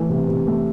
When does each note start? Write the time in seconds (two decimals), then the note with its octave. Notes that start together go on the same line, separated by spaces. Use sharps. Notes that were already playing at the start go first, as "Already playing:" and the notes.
Already playing: E3 A3
0.09 C3
0.28 C3
0.47 A3